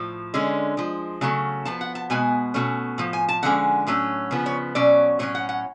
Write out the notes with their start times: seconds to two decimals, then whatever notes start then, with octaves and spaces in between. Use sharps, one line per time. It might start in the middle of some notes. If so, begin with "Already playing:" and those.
Already playing: A2 F3
0.34 D3 G#3 C#4
0.77 F3 G#3
1.21 C#3 F#3 A3 C#4
1.65 F3 B3 A5
1.81 F#5
1.95 A5
2.10 B2 G#3 B3 G#5
2.54 B2 A3 C#4
2.98 A2 F3
3.13 G#5
3.29 A5
3.43 D3 F3 G#3 C#4 F#5
3.87 A2 F#3 A3 C#4
4.31 C#3 F3 B3
4.46 C#5
4.75 B2 F#3 C#4 D5
5.19 A2 F#3 C#4 C#5
5.35 F#5
5.49 F#5